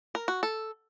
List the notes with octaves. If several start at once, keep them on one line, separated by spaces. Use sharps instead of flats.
A#4
F#4
A4